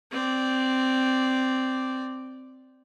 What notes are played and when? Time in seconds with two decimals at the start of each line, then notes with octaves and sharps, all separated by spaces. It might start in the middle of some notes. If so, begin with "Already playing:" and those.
0.12 C4 D5